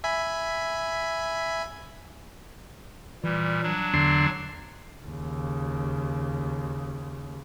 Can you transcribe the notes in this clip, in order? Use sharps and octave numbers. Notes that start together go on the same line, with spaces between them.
E5 G#5 B5
A#2 E3 G3
F#3 D4
E2 D3 C6
D#2 C#3